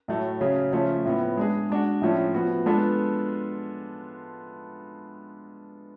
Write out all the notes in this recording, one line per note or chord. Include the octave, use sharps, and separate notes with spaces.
A2 F#3 A3
C#3 F#3 C#4 G#4
C#3 F3 A3 C#4 F4
A2 F3 B3
G#3 D4 G#4
G#3 D4 F#4
A2 F3 A3 C#4
F3 B3 F#4
G#3 B3 D4 F4 A4